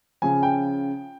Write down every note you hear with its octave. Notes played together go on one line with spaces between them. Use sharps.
C#3 F3 G#5
G5